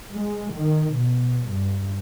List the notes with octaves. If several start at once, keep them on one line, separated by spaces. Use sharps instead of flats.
G#3
D#3
B2
G2